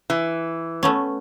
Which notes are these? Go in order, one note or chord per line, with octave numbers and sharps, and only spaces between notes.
E3
A3 B3 C#4